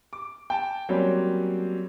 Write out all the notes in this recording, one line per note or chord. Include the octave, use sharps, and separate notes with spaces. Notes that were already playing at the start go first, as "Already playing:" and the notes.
D6
G5 A5
F#3 G3 A#3 C4 C#4